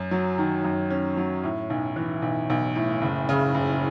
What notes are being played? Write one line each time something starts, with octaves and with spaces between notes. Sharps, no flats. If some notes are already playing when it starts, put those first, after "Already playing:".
Already playing: F#2
F#3
D#3
F#2
C#4
F#3
A2
B1
E3
B1
B1
A2
F#1
C#3
F#1